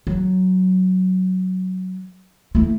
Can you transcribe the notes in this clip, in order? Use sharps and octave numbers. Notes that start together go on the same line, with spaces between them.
F#3
A3 E4